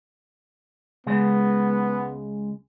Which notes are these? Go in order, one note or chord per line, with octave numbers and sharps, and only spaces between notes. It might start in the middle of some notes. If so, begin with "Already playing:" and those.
C#2 C#3 G#3 B3